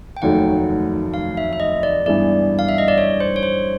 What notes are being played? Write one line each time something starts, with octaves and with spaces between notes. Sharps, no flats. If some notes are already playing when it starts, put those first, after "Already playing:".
G5
F1 D#2 D#3 F#3 A3 F#5
F5
E5
E5
D#5
D5
G2 E3 G#3 B3 E4 D5
F5
E5
D#5
D5
C#5
C5
C#5
C5